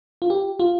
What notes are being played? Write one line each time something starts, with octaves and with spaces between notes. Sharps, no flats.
F4
G4
F4